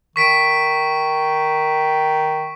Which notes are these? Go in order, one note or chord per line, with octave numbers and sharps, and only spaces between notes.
D#3 C#6 B6 D7